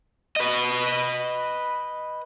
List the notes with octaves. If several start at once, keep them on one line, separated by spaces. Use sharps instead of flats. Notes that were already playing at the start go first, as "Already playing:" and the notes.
B4 D#5